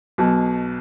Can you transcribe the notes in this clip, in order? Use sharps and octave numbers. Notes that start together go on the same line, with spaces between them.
B1 B2